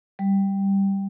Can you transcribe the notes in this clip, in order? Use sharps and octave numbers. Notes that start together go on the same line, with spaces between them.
G3